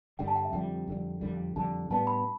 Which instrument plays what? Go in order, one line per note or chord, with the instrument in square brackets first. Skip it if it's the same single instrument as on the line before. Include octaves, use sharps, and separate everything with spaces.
[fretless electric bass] G2 D3 G3 [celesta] G5
[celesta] A5
G5
E5
[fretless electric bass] F2 D3 G3 [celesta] G5
[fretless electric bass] F2 D3 G3
F2 D3 G3
[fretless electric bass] F2 D3 G3 [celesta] A5
[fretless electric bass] A2 G3 B3 D4 [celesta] A5
[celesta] B5